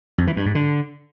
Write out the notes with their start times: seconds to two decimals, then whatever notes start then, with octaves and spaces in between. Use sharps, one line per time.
0.18 F2
0.27 E3
0.36 G2
0.46 G#2
0.55 D3